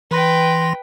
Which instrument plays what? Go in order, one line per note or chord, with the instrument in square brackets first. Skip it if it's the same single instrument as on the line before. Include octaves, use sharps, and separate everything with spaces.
[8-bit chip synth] E3 C6 A#6 [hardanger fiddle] B4 G5